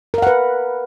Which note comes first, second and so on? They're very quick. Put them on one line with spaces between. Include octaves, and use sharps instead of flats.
A#4 F5 F#5 B4